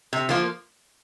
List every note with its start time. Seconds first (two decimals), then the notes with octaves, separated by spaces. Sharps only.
0.13 C3
0.29 F3 A#3 F4